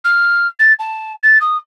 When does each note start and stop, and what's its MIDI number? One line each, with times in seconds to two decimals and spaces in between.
0.05 0.47 89
0.59 0.73 93
0.79 1.13 81
1.23 1.38 93
1.41 1.57 87